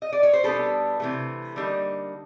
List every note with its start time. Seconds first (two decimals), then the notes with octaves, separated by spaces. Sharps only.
0.02 D#5
0.13 D5
0.23 C#5
0.33 C5
0.43 B2 G3 B3 D4 A4 B4
1.00 C3 E3 A3
1.56 D3 G3 A#3 D#4